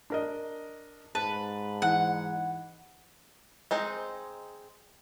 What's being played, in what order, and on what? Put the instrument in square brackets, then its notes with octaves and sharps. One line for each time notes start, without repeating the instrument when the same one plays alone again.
[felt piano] D4 A#4 D#5
[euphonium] G#2 [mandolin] B4 [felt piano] A5
[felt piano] E3 [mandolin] F#5
[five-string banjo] G#3 C4 D#4